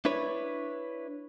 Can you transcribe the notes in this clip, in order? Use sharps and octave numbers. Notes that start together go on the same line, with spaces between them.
D4 E4 B4 C#5